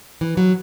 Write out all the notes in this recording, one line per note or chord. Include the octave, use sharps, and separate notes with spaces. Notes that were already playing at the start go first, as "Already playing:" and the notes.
E3
F#3